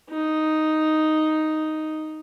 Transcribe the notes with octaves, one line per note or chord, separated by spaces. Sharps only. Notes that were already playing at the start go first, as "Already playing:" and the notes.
D#4